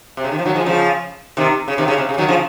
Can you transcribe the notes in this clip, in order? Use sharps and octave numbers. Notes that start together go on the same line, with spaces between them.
C3
C#3
D#3
F3
D#3 F#3
F3 G#3
C#3 F3
C3 D#3
C#3
C3 D#3
C#3
C3
C#3
D#3 F#3
C#3 F3